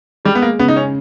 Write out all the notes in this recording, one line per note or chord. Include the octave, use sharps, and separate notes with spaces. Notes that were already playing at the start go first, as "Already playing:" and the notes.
G3 G#3
B3
A#3
C#3 B3
D#4
C#4